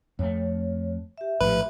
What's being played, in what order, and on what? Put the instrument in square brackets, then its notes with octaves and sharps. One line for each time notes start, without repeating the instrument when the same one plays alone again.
[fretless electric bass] F2 A3 [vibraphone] C#5
[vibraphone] G4 E5
[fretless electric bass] A#1 A2 F3 [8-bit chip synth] B4